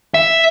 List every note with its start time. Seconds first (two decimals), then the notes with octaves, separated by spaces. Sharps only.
0.14 E5